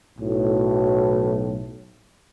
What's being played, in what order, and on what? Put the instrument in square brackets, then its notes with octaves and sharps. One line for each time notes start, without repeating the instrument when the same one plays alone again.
[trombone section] B1 A2